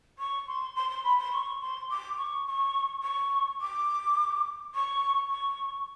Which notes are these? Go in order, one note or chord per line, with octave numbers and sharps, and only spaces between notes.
C#6
C6
C6
C6
B5
C6
C#6
C6
D6
C#6
C#6
C#6
D6
C#6
C#6